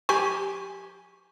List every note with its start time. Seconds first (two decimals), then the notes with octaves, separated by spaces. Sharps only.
0.09 G4 G#5 C#6